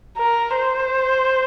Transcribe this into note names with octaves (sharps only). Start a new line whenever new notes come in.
A#4
C5